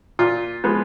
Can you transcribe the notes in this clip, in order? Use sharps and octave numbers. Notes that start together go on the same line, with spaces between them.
A#2 F4
F3 G#3 B3